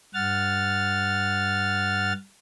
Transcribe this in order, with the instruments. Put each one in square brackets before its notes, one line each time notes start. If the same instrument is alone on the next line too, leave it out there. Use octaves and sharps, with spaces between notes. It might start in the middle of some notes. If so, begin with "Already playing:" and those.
[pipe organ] G2 F#5 F6 A6